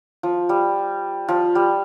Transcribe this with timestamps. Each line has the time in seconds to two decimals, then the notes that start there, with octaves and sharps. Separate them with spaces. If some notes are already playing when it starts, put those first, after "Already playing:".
0.23 F3
0.49 G3
1.29 F3
1.55 G3